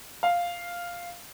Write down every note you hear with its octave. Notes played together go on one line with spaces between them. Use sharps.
F5